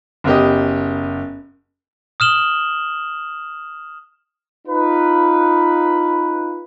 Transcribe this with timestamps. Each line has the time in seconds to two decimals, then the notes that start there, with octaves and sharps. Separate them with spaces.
0.24 F#1 B3 G4 D#5
2.20 D#6 F6 E7 F#7 G7
4.67 D#4 F4 B4